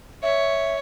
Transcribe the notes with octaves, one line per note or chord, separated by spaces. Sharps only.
C#5 E5